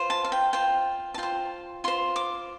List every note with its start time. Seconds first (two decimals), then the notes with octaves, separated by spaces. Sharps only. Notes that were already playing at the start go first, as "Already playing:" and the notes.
Already playing: F4 C5
0.10 A5
0.25 F5
0.32 G5
0.53 F4 C5 G5
1.14 A5
1.18 F4 C5 G5
1.84 F4 C5 C6
2.16 D6